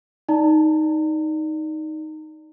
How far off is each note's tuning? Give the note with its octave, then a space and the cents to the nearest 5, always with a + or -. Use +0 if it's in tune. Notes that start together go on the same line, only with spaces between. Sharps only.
D#4 +0 D5 +0 A#5 -40